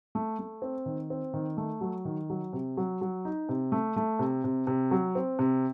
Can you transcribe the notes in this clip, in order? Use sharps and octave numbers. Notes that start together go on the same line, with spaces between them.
A3
A3
C4
D#3
C4
D#3
A3
F#3
D#3
F#3
C3
F#3
F#3
D#4
C3
A3
A3
C3
C3
C3
F#3
C4
C3